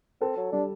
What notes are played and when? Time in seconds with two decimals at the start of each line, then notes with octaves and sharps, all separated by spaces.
0.21 C4 A4
0.37 F#3
0.52 G3 D4